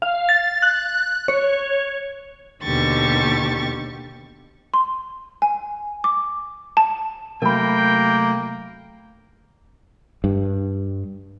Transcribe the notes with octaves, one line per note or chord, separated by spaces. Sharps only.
F5
A6
F#6
C#5
D#2 B2 D3 G4 C#6 A6
C6
G#5
D6
A5
C3 F#3 A3 A#3 A#4 G5 B5
G2